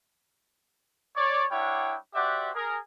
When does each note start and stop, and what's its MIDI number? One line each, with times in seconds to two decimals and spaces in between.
1.16 1.44 73
1.16 1.44 74
1.51 1.96 55
1.51 1.96 62
1.51 1.96 64
1.51 1.96 73
1.51 1.96 78
1.51 1.96 79
2.14 2.50 66
2.14 2.50 67
2.14 2.50 72
2.14 2.50 74
2.14 2.50 76
2.14 2.50 78
2.55 2.78 68
2.55 2.78 70